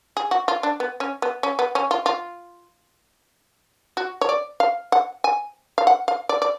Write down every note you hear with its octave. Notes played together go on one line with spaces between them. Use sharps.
G#4
F#4
F4
D4
B3
C#4
B3
C#4
B3
C#4
F4
F4
F#4
C#5
D5
F5
F#5
G#5
F5
F#5
F5
D5
D5